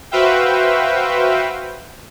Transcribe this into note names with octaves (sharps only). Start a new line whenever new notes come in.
F#4 B4 C5 E5 F5 G5